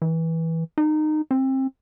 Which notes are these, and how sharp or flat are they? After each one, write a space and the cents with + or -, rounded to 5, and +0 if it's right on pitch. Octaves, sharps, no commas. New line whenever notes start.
E3 -15
D#4 -20
C4 +25